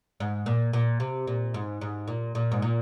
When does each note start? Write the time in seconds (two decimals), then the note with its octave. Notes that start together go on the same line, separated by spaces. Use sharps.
0.20 G#2
0.46 A#2
0.73 A#2
1.00 C3
1.27 A#2
1.54 G#2
1.81 G#2
2.07 A#2
2.35 A#2
2.52 G#2
2.62 A#2